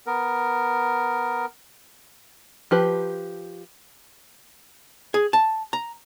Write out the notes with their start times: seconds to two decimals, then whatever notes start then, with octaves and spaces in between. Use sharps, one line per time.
0.07 B3 A#4
2.71 F3 G4 B4
5.14 G#4
5.33 A5
5.73 A#5